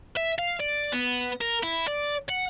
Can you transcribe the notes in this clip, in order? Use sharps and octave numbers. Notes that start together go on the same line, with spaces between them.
E5
F5
D5
B3
A#4
E4
D5
F#5